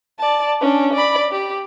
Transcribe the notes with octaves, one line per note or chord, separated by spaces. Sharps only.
D5 A5
C#4 D4
D5 B5
G4